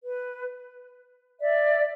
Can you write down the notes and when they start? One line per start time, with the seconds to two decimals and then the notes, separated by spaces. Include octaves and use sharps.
0.03 B4
1.40 D5 E5